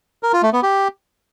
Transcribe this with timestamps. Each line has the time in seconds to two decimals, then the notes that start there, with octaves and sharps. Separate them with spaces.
0.23 A#4
0.33 F4
0.43 A3
0.53 B3
0.63 G4